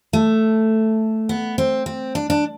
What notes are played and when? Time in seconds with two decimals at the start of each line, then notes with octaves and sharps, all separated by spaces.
0.13 A3
1.29 B3
1.58 C4
1.86 C4
2.15 D4
2.30 D4